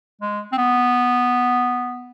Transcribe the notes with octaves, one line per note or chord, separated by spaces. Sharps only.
G#3
C4
B3